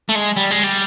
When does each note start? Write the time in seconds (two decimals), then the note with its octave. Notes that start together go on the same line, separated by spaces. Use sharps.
0.09 A3
0.15 G#3
0.37 G3
0.51 G#3
0.64 G3